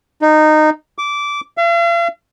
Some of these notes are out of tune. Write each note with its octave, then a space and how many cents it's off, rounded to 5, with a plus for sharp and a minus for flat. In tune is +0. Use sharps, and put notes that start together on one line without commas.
D#4 -15
D6 -15
F5 -45